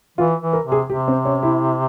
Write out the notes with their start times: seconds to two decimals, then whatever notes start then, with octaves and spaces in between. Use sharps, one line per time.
0.18 E3 F4
0.41 E3
0.53 A#4
0.66 C3
0.72 G#4
0.90 C3 G4
1.08 C4
1.25 C#4
1.43 E4